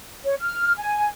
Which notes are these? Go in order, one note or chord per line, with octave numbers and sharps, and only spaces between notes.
C#5
F6
G#5